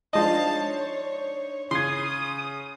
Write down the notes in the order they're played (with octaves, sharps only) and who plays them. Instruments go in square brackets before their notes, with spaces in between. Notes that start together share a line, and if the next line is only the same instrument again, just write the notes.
[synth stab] F3 G#3 D#5 [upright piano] D4 D#4 C5 [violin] F5 A5
[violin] C#5
[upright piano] C#3 G#6 [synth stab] C6 [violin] D#6